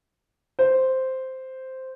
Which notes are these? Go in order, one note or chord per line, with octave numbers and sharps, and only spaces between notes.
C5